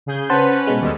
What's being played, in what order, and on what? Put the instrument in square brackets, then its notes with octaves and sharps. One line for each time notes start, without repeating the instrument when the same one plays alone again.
[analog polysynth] C#3 G#4 G6
[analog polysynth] C#4 B4 [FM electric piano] C5 F#5 A5
[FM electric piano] B2 G#3
[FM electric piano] D#2 [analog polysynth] G3 G#3 A4